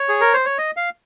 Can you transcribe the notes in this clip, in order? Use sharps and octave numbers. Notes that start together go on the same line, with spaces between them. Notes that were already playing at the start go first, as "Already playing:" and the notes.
Already playing: C#5
G#4
A#4
C5
C#5
D#5
F5